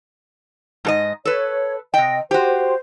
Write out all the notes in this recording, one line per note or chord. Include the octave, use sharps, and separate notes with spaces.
G#2 A4 D#5
A4 B4 C#5
C3 D#5 G5
F#4 G4 C5